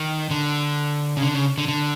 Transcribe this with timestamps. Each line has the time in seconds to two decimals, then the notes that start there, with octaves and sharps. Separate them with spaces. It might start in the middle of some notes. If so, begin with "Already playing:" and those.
Already playing: D#3
0.30 D3
1.17 C#3
1.22 D3
1.34 C#3
1.58 D3
1.68 D3